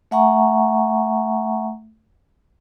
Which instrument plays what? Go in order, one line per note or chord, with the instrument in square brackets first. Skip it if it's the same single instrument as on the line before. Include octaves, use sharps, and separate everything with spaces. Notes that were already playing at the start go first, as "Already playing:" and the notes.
[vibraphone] A3 E5 F#5 G#5 A#5 C#6